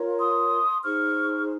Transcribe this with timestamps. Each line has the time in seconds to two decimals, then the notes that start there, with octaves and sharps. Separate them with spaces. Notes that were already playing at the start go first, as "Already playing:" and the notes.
Already playing: F4 A#4 C#5
0.18 C6 D#6
0.83 D#4 G#4 C5 C#6 F6